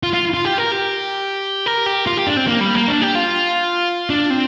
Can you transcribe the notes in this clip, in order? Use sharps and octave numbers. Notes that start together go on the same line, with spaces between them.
F4
F4
F4
G4
A#4
G4
A#4
G4
F4
G4
D4
C4
A#3
G3
A#3
D4
G4
F4
D4
C4